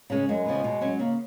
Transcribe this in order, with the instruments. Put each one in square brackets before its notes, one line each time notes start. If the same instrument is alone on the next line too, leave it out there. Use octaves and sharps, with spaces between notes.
[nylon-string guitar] C#3 G#3 C#4
[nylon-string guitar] F#2 [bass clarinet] G#3
[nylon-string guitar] C#3 F3 B3
B2
F#3 C#4
[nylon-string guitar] C#3 [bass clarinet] A#3